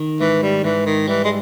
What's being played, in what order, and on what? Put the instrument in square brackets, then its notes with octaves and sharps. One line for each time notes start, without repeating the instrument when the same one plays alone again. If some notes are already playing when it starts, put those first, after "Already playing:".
Already playing: [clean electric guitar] D#3
[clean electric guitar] G#2 [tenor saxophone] E3
[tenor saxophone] G3
[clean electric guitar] G#2 [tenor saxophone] E3
[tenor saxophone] D#3
[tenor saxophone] E3 [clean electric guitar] G3
[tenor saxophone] G#3